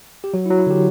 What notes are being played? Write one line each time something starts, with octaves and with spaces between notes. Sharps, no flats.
G4
F#3 F#4
E4
F#3
E4
D3 G4